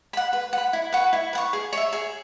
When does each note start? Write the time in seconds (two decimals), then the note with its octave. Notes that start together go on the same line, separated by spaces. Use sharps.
0.13 F#5 B5
0.33 B4
0.53 F#5 B5
0.73 E4
0.92 B4 F#5 C#6
1.13 E4
1.33 B4 F#5
1.38 C#6
1.53 G#4
1.73 C#5 E5
1.93 G#4